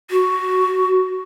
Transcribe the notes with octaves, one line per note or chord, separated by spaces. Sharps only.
F#4